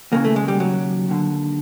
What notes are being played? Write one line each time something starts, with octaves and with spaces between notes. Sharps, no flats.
D#2 C#3 E3 A#3
A3
G#3
G3
F#3
D#2 D3